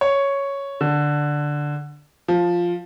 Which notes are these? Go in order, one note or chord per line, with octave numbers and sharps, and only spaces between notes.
C#5
D3
F3